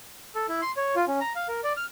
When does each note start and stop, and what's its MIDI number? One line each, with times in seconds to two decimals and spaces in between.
0.35 0.47 69
0.49 0.61 64
0.62 0.72 84
0.77 0.95 73
0.96 1.05 65
1.08 1.20 61
1.21 1.33 82
1.36 1.48 77
1.48 1.61 70
1.64 1.73 74
1.77 1.85 89